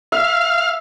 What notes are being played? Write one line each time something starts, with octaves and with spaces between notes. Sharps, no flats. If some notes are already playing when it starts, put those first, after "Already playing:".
E5 F5